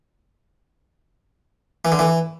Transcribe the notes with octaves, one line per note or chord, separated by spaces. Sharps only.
E3
D3
E3